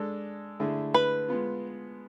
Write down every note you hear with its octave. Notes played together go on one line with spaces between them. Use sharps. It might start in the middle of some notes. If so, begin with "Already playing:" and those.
Already playing: G#3 D4 A4
D3 A3 E4 G#4
B4
G#3 B3 F4